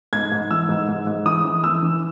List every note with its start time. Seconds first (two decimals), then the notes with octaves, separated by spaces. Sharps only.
0.13 G#2 G#6
0.32 G#2
0.51 E3 E6
0.69 G#2
0.89 G#2
1.07 G#2
1.26 E3 D#6
1.44 E3
1.64 E3 E6
1.83 E3